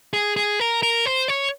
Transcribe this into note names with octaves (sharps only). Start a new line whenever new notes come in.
G#4
G#4
A#4
A#4
C5
C#5